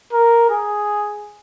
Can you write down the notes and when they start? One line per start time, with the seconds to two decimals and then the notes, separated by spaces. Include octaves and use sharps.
0.13 A#4
0.50 G#4